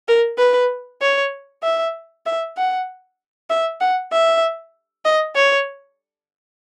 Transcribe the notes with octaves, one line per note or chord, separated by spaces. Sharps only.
A#4
B4
C#5
E5
E5
F#5
E5
F#5
E5
D#5
C#5